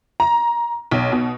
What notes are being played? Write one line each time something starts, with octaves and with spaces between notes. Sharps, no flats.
A#5
B1
B2